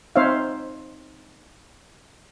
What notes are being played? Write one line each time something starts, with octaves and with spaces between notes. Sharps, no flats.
C4 D#4 C5 C#5 E5 F5